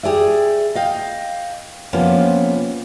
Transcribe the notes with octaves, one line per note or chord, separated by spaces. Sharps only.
G4 G#4 D5 E5
D#5 F5 G5
C3 F3 A#3 B3 C#4